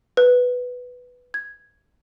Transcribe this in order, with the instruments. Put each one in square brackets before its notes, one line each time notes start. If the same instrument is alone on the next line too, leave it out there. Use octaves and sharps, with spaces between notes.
[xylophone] B4
G#6